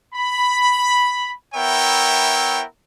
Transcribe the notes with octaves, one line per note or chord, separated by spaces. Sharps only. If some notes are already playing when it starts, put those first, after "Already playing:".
B5
B3 E4 A#4 C#5 E5 G5